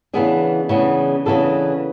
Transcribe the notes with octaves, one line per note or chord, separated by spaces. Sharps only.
C#3 E3 B3 D4 G#4
C#3 E3 B3 D4
C#3 E3 B3 D4 A4